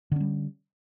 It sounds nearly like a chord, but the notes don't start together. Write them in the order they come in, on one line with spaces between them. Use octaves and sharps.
D3 C#4 G3